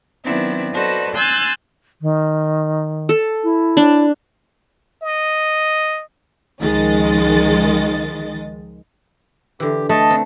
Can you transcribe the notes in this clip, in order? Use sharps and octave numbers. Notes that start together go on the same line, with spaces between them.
D#3 F#3 B3 C4 D4 E4
F#4 A4 B4 C5 D5 D#5
G#5 C6 E6 F#6 G6 A6
D#3
A4
E4
D4
D#5
C#2 D#3 F3 G#3 D#5 A6
D3 E3 G4
A3 D#5 A5
C4 D4